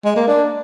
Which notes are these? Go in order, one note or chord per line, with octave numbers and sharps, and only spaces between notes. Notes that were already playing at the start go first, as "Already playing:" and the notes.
G#3
A#3
D4